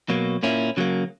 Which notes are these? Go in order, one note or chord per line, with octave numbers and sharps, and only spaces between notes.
B2 F#3 A#3
A#2 A#3 C#4 E4
C#3 F#3 A#3